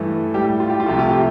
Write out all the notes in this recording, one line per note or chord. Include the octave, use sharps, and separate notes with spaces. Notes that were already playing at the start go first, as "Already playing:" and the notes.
Already playing: G2 E3 A3
A2 G3 G4
F4
G4
F4
C2 C3 F3 A3 G4
F4
G4